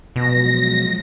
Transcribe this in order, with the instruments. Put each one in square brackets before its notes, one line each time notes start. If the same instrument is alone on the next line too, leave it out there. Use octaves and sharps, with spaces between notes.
[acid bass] B2 [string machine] F3 F#3 G#3 [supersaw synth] A#6